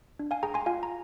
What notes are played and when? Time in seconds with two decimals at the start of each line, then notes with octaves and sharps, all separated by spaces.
0.19 D4
0.31 F5 G#5
0.43 G#4 G5 A#5
0.54 G#5 C6
0.66 F4 F5 G#5
0.83 A#5